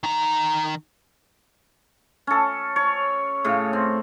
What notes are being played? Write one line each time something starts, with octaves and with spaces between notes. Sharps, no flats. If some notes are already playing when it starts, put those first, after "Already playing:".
D#3 A#5
C#4 A4
C#5
A2 C#3
C4